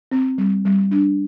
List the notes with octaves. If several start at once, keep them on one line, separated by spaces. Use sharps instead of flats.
C4
G3
G3
D4